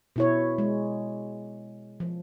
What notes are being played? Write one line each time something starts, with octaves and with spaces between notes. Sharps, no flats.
B2 E4 C#5
G#3
F3